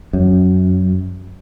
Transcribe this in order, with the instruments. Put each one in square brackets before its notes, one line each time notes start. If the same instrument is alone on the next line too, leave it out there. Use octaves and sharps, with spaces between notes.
[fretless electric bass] F#2